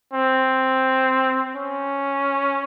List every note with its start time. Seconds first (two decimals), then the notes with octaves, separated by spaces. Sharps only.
0.13 C4
1.56 C#4